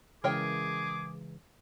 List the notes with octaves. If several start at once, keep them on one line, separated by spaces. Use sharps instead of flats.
C#3 E3 G#3 G#4 A#4 C#5 G5 D6